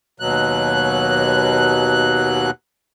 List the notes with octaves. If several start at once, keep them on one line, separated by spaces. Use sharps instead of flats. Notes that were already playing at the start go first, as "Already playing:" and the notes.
D#2 B2 F#3 F#6